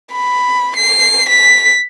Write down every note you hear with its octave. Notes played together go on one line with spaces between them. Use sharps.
B5
C7
B6